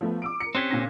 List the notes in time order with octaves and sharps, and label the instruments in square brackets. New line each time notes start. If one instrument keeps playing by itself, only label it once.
[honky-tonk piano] F3 A3 B3
D6 E6 D7
A#4 C#7
[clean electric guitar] C4 C#4 G4 [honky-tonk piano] F#6 G#6 B6
[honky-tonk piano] A#2 D3 A#6